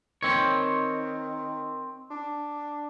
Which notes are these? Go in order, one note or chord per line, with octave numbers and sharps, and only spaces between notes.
D#3 C4 C#5
D4